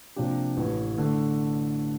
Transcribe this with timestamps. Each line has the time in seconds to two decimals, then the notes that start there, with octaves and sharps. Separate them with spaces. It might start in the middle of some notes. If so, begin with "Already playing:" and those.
0.16 C3 F3 A#3 D4 G4
0.57 A1 A2 E3
0.98 D3 A3